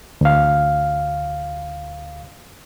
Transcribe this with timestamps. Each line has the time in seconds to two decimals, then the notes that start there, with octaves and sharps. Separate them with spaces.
0.21 D2 F5